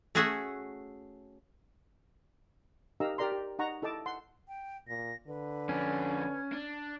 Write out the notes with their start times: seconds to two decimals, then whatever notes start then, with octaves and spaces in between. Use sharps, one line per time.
0.15 A3 C#4 F#4 G#4 E5 F#5
3.00 D#4 G4 A#4 F5 A#5 E6
3.18 G4 A#4 D5 A#5 C6
3.32 G4
3.59 D#4 F#5 A#5 C#6
3.82 E4 A4 D#5 A5 D6
4.06 F#5 C6
4.48 G5
4.88 A#2 A#6
5.27 D3 B4
5.69 F2 C#4 D4
6.52 D4